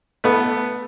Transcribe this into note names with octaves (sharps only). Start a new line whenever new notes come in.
A3 B3